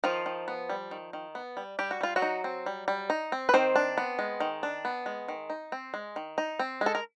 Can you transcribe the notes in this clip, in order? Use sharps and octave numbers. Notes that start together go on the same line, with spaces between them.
D#3 F3 F4
D#3
B3
G3
D#3
D#3
B3
G3
G3 G4
F#4
G3 F4
F#3 F#4
D#4
C4
G3
G3
D#4
C4
B4
D#3 C4 C5
D4
B3
G#3
D#3
D4
B3
G#3
D#3
D#4
C4
G#3
D#3
D#4
C4
G#3
A4
A#4